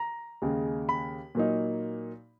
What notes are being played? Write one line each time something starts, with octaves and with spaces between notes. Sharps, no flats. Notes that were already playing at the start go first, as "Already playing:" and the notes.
Already playing: A#5
D#2 C#3 G#3
B5
A#2 F#3 A#3 D#4